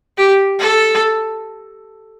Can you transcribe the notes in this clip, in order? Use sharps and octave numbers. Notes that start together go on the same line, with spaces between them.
G4
A4